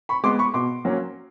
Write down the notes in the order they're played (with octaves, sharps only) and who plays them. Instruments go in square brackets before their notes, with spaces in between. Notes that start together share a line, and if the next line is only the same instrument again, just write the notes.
[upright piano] B5 C#6
G#3 B3 C6 D6
B5 C#6
B2 C6 D6
F#3 A#3 C#4